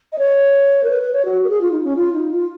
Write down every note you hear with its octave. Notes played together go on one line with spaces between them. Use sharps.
D#5
C#5
A#4
B4
B4
C#5
F#4
A#4
G#4
F4
D#4
C#4
F4
D#4
F4